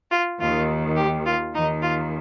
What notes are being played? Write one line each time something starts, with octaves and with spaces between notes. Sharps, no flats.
F4
D#2 D#3 F4
G4
F4
D#2 D#3 D#4
F4